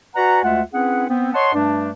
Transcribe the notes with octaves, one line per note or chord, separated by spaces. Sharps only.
F#4 B4 D5 F#5 G#5 A#5
D2 G#3 A3 F4 E5 F#5
C4 C#4 E4 G#4 B4 F#5
B3 C4
C#5 D#5 F#5 A5 C6
G2 G3 A3 D4